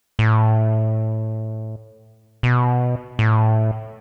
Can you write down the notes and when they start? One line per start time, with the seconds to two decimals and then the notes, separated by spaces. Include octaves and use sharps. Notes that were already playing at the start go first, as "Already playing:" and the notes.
0.19 A2
2.43 B2
3.19 A2